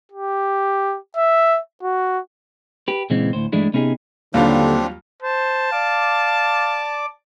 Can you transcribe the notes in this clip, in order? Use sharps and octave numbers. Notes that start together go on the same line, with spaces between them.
G4
E5
F#4
G4 B4
A#2 C#3 E3 G#3 B3 C4
D2 A2 C5
G2 E3 G#3 A3 D4 E4
C3 B3 C#4 D#4 G4 G#4
D#2 D3 F#3 G3 C4 D4 F4 G4
C5 A5
D5 F5 D6